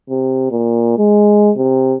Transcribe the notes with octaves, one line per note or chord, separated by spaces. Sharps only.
C3
A#2
G#3
C3